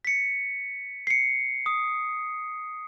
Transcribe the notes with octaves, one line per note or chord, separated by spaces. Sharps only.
B6 C#7
C7 C#7
D#6